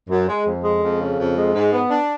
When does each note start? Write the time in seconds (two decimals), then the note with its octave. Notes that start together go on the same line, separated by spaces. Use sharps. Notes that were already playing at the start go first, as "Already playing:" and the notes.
0.09 F#2
0.28 G#3
0.45 F2
0.64 G#3
0.82 F2
1.00 C#3
1.18 F2
1.36 G#3
1.54 G#2
1.72 B3
1.89 D4